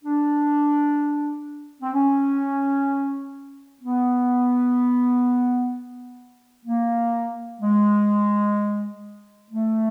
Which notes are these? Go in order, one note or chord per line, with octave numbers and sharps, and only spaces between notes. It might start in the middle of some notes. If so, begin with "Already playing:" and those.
D4
C4
C#4
B3
A#3
G#3
A3